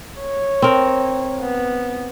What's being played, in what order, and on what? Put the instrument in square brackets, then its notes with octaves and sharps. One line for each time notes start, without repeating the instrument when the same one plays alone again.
[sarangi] C#5
[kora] C4 A#4
[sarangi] B3